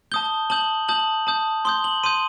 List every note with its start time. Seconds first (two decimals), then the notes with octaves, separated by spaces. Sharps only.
0.12 A5 D#6 G6 G7
0.50 A5 D#6 G6 F#7
0.88 A5 D#6 G6 F#7
1.27 A5 D#6 G6
1.65 C6 D#6 G6 G7
1.84 F#7
2.03 C6 D#6 G6 D#7